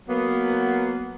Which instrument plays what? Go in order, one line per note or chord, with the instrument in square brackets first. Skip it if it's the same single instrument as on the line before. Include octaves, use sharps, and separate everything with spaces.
[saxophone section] F#3 A#3 B3